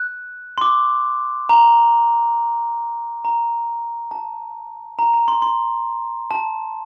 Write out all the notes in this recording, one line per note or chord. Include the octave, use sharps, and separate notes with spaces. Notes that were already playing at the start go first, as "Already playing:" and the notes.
Already playing: F#6
C6
D6
A#5
A#5
A5
A#5
A#5
C6
C6
A5